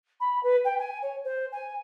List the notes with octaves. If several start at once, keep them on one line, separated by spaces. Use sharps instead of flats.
B5
B4
G5
G#5
C#5
C5
G#5